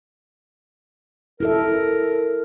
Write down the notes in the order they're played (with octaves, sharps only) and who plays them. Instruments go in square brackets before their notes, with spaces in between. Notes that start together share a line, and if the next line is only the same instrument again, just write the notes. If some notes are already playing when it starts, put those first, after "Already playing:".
[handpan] E4 A4 E5 [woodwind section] A#4